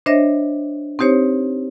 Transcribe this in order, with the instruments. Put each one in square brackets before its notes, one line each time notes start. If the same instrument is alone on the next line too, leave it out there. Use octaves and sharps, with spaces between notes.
[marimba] D4 C5 C#5 D#5 E5 A#6
C4 D#4 G4 C5 C#5